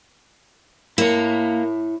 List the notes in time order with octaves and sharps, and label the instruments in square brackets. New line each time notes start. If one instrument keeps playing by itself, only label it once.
[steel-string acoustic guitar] A#3 [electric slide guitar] E4 C#5